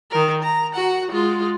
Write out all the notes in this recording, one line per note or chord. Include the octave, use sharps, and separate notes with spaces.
D#3 A#4
A#5
F#4 F#5
G#3 F4